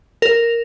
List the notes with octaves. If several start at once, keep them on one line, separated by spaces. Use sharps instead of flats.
A#4